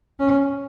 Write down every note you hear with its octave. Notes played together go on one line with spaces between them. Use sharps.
C#4